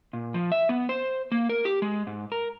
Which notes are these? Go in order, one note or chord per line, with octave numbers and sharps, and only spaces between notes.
A#2
F3
E5
B3
C5
A#3
A#4
G4
G#3
G#2
A#4